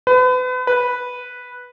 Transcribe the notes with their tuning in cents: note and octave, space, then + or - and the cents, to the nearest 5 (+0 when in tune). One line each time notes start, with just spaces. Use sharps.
B4 +35
B4 -5